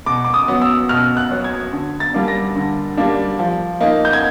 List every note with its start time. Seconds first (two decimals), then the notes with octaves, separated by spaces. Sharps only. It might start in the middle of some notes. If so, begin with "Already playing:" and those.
0.06 B2 D6
0.24 D6
0.34 D#6
0.48 F#3 B3
0.62 E6
0.89 B2 F6
1.17 F#6
1.31 F#3 B3
1.44 G#6
1.72 D3
2.00 A6
2.14 G3 A#3 D4
2.28 A#6
2.56 D3
2.97 G3 A#3 D4
3.39 F3
3.80 A#3 D#4
4.05 G6
4.13 G#6